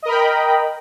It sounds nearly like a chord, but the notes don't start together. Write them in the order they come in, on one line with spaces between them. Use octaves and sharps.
D#5 A#4 B5 G5